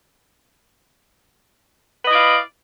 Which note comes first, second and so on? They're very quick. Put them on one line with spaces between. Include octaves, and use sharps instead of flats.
B4 D#5 E4 D5 F5